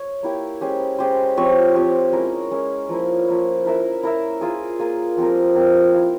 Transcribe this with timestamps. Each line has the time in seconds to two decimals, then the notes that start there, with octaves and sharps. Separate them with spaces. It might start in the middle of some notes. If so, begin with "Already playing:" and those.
Already playing: C#5
0.23 A#3 E4 G4 C#5
0.61 G#3 C#4 G4 C5
0.99 G#3 C#4 G4 C5
1.37 F3 C4 G4 C#5
1.75 F3 C4 G4 C#5
2.12 G#3 C#4 E4 A#4
2.51 G#3 C#4 E4 A#4
2.89 F3 A#3 E4
3.27 F3 A#3 E4
3.65 E4 A#4 E5
4.03 E4 A#4 E5
4.41 A#3 F4 G#4
4.79 A#3 F4 G#4
5.17 F3 C4 G4 A#4
5.55 F3 C4 G4 A#4
5.93 E4 A#4 F5